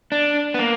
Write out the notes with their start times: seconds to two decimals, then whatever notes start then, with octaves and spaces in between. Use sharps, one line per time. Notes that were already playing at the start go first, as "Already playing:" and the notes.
0.12 D4
0.54 B3
0.59 A#3